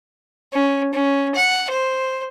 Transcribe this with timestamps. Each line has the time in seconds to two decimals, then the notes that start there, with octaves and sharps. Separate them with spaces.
0.53 C#4
0.94 C#4
1.35 F#5
1.70 C5